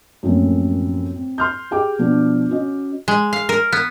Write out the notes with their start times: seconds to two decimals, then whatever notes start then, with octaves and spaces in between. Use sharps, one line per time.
0.23 F#2 A2 F3 A#3 C4 C#4
1.16 C4
1.38 C6 F6 G6
1.71 G4 G#4 G5 D6
1.99 B2 F3 B3 D4
2.51 C#4 F#4 D#5
3.08 G#3
3.33 F5
3.49 A#4
3.73 B3